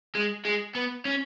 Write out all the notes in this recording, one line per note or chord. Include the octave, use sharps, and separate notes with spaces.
G#3
G#3
B3
C#4